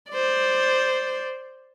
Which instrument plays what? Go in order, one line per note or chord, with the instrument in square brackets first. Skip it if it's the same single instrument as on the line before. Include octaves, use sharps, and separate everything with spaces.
[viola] C5 D5